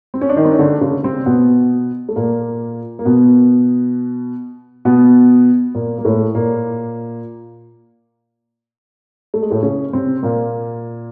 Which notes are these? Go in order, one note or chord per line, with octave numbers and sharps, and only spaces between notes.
C4
C#4
D4
D#3 D#4
C4
C#4
D3 D4
C#3 C#4
C3 C4
B2 B3
A3
A#2 A#3
A#3
B2 B3
B2 B3
A#2 A#3
A#3
A2 A3
A#2 A#3
A3
G#3
A2 A3
C#3 C#4
C3 C4
A#2 A#3